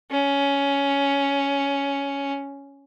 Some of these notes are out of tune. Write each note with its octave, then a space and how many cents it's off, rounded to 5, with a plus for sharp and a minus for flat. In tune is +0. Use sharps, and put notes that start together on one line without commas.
C#4 +10